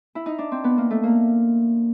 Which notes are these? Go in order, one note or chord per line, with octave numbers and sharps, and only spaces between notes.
E4
D#4
D4
C4
B3
A#3
A3
A#3